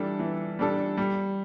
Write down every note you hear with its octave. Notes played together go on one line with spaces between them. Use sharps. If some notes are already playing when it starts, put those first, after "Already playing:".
Already playing: E3 G3 D4 A4
E3
G3 D4 A4
G3